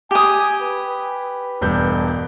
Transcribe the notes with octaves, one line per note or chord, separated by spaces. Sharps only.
G4 G#5 D#6
B4
E1 G2 G6